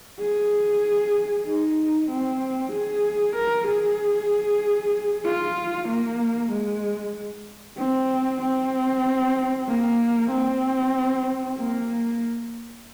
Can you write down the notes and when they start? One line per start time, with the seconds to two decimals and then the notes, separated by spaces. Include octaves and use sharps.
0.20 G#4
1.47 D#4
2.10 C4
2.72 G#4
3.36 A#4
3.68 G#4
5.26 F4
5.88 A#3
6.52 G#3
7.78 C4
8.42 C4
9.68 A#3
10.31 C4
11.58 A#3